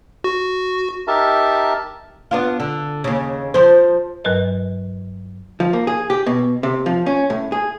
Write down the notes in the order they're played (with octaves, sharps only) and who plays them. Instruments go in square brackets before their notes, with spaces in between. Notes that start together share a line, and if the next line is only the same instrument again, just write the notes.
[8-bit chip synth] F#4
[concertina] D#4 G4 A#4 E5 A5
[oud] B3 D4 F4
D3
D#2 C#3
F3 C5
[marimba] G2 F#3 A#4 B4 D#5
[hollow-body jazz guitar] F3
A#3
G#4
G4
B2
C3
F3
C#4
A2
G#4